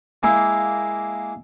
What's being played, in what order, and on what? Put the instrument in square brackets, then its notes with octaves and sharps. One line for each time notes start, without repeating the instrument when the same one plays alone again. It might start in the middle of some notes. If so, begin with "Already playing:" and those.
[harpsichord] G#3 A#3 E4